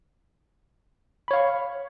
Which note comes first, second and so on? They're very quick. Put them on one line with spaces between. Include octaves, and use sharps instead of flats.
B5 C#5 F5 C#6